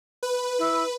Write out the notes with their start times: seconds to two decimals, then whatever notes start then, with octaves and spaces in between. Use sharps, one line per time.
0.23 B4
0.59 E4